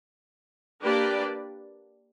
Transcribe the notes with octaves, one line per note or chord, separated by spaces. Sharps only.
A#3 D4 G4 B4 D5